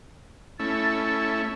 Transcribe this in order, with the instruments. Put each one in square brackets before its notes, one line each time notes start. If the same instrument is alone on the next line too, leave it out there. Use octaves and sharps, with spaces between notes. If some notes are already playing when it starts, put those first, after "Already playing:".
[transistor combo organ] A3 C#4 E4 [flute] A6